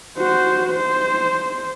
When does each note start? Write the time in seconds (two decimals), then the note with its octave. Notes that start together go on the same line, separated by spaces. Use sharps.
0.17 F#4 C5
0.70 C5